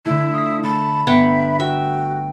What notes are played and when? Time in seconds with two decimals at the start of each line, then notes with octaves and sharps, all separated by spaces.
0.06 D3 A3 E4
0.34 F4 D#6 B6
0.63 A3 A5 B5
1.07 G1 B3 E5 F#5 G5
1.60 F#4 E5 G5